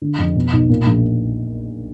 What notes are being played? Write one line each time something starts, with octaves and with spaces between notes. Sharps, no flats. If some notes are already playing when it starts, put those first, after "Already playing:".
D3
F2
B2
B1
A#2
A#1